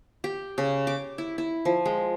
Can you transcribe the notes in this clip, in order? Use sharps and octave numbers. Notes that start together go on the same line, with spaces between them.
G4
C#3
D6
E4
E4
F3
G#3